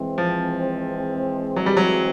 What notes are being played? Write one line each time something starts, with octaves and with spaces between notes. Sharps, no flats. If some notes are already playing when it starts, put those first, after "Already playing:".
Already playing: E3 G#3 C4
F3
F#3
G3
F#3